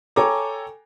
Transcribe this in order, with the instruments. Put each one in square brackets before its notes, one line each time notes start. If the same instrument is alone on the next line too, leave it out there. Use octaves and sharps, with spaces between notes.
[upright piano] A4 C#5 G5 G#5 A#5 D6